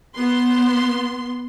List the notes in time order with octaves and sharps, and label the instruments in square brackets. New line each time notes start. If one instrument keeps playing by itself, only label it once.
[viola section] B3 C6